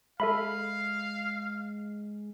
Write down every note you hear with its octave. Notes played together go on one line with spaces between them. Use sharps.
G#3 A4 E5 F5 B5